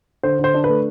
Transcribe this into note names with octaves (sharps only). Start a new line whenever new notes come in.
D3 C5
D3 C5
D4
B4
A3